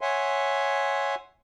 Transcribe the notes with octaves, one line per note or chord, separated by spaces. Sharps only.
C#5 E5 F#5 G#5 C6